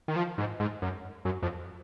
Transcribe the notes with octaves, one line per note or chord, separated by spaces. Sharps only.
D#3
F3
G#2
G#2
F#2
F#2
F2